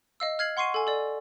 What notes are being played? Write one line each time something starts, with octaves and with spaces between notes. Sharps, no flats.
D#5 F5 E6
F6 G#6 C7 F#7
F#5 C6 C#6 C7 D#7
A4 G#5
A4 D5